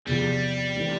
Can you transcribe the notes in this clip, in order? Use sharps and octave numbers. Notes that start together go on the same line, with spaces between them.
E2 C3 F3 G3
E3 A3 C4 G4